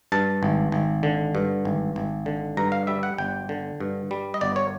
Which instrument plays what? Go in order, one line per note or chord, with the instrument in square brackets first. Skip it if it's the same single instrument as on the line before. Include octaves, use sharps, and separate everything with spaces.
[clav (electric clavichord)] G2 A5
G#1
G#1
D3
G2
G#1
G#1
D3
G2 A#5
F5
G3 E5
F#5
G1 G5
D3
G2
G3
D#5
G1 D5
C#5